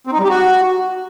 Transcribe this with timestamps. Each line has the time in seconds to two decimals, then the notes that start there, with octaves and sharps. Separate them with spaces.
0.07 C4
0.13 D#4
0.18 G3
0.24 G4
0.30 F#4